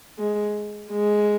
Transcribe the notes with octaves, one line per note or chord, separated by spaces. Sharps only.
G#3
G#3